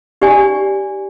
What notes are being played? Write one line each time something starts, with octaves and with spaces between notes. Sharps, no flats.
D#4 G4 D5 G#5